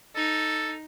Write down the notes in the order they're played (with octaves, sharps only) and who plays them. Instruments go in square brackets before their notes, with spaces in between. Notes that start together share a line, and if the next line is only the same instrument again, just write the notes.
[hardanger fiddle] D#4 [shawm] A4